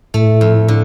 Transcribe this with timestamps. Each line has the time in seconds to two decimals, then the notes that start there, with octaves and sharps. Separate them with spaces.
0.14 A2 A3
0.41 F2
0.68 D3